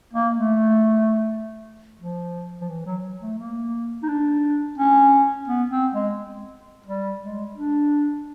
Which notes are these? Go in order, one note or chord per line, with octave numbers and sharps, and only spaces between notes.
A#3
A3
F3
F3
E3
F#3
A3
A#3
D#4
D4
C#4
B3
C4
G#3
G3
G#3
D4